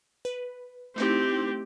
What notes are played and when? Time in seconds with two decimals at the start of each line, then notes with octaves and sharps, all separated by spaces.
0.25 B4
0.96 A3 C4 D#4 E4 G4